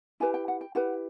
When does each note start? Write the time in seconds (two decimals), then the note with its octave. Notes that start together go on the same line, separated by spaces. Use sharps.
0.20 E4 G4 B4 G#5
0.34 G5
0.48 F#5
0.61 G5
0.75 E4 G4 B4 F#5